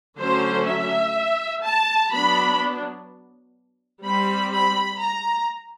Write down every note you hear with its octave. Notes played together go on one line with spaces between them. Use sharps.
D3 F#3 A3 C#4 C5
E5
A5
F#3 B3 D4 B5
G3 C4 B5
B5
A#5